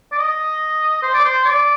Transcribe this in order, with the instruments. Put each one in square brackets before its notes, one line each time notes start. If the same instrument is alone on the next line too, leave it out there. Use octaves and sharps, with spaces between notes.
[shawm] D5
D#5
C5
D5
C5
D5